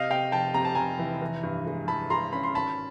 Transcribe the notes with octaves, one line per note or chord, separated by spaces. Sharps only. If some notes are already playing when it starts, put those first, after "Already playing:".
Already playing: C3 D#5 F5
C3 F5 G5
F1 G5 A5
C3 A#5
A5
F1 G#5 A#5
E3
E3
G2
G#3
E3 A5 B5
G#3 A#5 C6
C#4 B5
C6
G#1 A5 B5